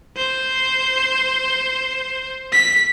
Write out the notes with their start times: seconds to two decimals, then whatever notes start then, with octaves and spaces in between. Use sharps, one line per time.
0.17 C5
2.52 B6